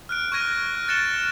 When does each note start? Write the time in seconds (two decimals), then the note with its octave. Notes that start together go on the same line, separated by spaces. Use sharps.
0.09 F6 F#6 D7
0.32 C#6 F#6 G#6 A#6 D#7
0.75 F#6
0.88 F#6 A6 C#7 D7 E7 G7